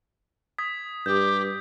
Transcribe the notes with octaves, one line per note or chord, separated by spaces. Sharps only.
D#6 G#6 B6
G2 G4 G6